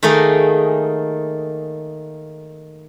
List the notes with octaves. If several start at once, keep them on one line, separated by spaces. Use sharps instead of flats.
D#3 A3 A#3 D#4 G#4